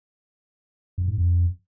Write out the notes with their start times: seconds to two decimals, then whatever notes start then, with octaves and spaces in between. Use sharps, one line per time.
0.98 F#2
1.08 G#2
1.18 F2